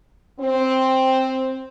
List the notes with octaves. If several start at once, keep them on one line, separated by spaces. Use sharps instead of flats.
C4